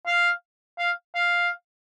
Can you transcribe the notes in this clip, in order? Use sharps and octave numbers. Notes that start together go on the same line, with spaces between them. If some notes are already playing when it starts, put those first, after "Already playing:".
F5
F5
F5